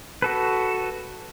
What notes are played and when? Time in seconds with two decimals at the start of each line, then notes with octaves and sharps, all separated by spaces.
0.22 F#4 A4 B4